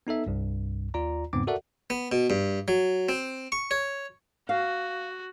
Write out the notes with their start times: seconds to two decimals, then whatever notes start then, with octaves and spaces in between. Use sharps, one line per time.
0.07 B3 D#4 A4 E5
0.26 C2 G2
0.94 D#2 F4 D5 A#5
1.33 E2 G#2 C#3 B3 C4 D6
1.47 F#4 A4 A#4 D5 E5 F#5
1.90 B3
2.12 B2
2.30 G2
2.68 F#3
3.09 C4
3.52 C#6
3.71 C#5
4.49 F#4 F5